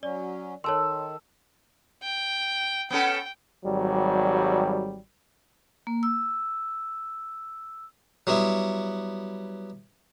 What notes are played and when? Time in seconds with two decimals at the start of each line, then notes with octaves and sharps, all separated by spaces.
0.03 F#3 C#4 D5
0.64 D#3 A4 C#5 A5 C6 E6
2.03 G5
2.90 B3 C#4 A4 G5
3.64 G#1 F#3 G3
5.87 A#3
6.03 E6
8.27 F#3 G3 B3 E4